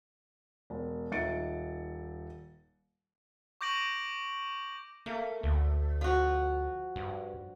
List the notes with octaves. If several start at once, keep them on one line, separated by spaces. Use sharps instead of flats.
E1
D#1 D#4 E5 A6 C#7 D7
C#6 D6 G6 A#6 D7 F#7
A3 A#3
D2
F3 F#4
G2